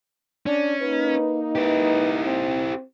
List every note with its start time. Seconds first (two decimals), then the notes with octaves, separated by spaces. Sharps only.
0.46 C#4 D4
0.81 A#3 D#4 B4
1.55 E4 G4 B4
2.25 C4